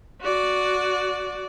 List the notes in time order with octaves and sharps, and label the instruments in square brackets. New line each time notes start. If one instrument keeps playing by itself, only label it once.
[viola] F#4 D5